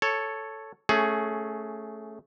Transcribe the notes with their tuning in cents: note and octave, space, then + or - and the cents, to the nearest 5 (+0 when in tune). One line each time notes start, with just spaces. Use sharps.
A4 +0 C#5 +0
A3 +0 C#4 +0 G#4 +15